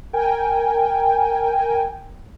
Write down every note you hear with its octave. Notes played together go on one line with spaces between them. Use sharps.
A#4 G5 G#5